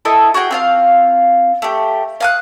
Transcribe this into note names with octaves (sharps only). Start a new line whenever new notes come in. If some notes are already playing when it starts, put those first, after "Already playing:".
E4 A4 D#5 E5
F#4 G#4 F#5 G5
C4 F4 F5
A3 G4
F5 D#6 F#6